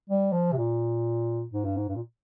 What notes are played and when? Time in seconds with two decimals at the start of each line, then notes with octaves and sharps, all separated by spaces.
0.09 G3
0.32 F3
0.52 C3
0.57 A#2
1.53 G#2
1.65 G2
1.77 G#2
1.88 G2
1.96 A#2